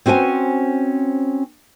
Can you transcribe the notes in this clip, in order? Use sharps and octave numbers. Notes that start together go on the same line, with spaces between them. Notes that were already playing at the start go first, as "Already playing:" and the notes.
C4 C#4 F#4 C5 G#5